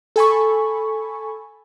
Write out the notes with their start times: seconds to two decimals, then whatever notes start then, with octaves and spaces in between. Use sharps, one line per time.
0.16 A4 G#5 B5 C#6